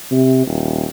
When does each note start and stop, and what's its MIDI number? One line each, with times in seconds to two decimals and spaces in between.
0.12 0.42 48
0.47 0.86 27